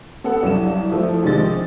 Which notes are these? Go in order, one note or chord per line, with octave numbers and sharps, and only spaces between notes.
B3 A4 F#5
C2 G2 F#3 E7
F3 A3 E4
A#1 C3 D#3 G#3 A6